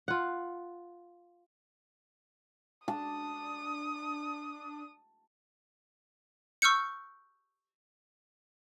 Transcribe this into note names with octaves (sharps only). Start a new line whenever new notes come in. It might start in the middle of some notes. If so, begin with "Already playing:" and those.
F4 F#5
D4 A5 D#6
C#6 E6 F6 G6 C#7